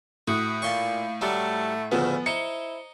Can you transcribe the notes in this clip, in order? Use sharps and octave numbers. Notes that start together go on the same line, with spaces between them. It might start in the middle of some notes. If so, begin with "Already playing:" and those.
A2 F#4 D#6 F#6 C#7
A#2 F5 A5 C6 C#6 C#7
F#3 G3 A3 D4 F#5 A#5 C#7
D2 A2 C#3 F3 B3 F4 G#5
D#4 E4 C5 C#7 E7 G7